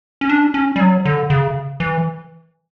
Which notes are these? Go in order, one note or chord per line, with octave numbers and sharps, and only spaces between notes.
C#4
D4
C#4
G3
F#3
D3
C#3
E3